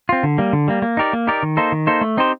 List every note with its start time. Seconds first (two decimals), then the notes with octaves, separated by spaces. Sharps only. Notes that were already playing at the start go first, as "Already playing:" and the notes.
0.09 C4 F4
0.23 D3
0.38 G3 A#3
0.53 D3
0.68 G3 A#3
0.82 A#3
0.97 D#4 G4 A#4 D5
1.13 A#3
1.27 D#4 G4 A#4 D5
1.43 D#3
1.57 A#3 D#4 A4 C5
1.72 D#3
1.87 A#3 D#4 A4 C5
2.01 A3
2.17 C4 D#4 G4 C5